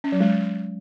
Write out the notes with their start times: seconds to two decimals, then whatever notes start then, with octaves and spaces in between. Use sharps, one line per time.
0.04 C#4
0.12 F#3
0.21 G#3